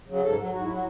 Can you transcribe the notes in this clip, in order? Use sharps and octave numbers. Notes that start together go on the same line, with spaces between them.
C#3 F#3
G#2 A4
F#3
G#2 F#4
E4
F#3 F#4